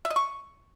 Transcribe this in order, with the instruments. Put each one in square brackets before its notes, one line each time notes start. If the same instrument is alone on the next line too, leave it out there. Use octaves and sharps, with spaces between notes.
[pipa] E5
D#5
C#6